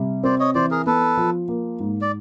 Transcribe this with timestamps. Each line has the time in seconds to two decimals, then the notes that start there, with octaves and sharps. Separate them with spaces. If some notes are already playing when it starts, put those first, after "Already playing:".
Already playing: C3 G3
0.24 C4 C5 D5
0.40 C#5 D#5
0.55 E3 C5 D5
0.71 G#4 A#4
0.86 B3 A4 B4
1.17 F3
1.48 A#3
1.80 G#2
2.02 D5